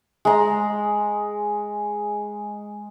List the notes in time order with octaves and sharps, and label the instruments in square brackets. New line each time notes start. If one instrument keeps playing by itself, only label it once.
[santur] G#3 A#5